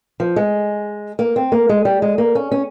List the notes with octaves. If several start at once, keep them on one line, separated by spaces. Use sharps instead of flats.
F3
G#3
A#3
C4
A#3
G#3
G3
G#3
A#3
C#4
C#4